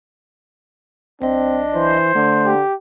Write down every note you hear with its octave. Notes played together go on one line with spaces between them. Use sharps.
B1 C4 D4 D#5
E3 C5
D3 A3
G4